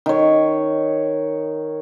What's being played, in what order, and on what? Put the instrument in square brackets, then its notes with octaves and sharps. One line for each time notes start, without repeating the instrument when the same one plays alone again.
[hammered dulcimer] D#3 C#5